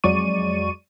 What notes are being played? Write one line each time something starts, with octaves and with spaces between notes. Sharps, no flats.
F2 F#3 G#3 D5 C#6 D#7